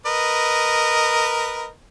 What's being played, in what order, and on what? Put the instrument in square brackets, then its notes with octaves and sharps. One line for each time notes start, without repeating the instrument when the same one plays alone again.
[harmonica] A#4 B4 D#5